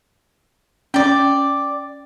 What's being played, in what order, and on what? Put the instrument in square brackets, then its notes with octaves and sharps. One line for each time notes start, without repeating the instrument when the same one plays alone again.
[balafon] C#4 [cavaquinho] D5 G5